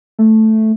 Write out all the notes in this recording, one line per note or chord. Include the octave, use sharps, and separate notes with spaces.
A3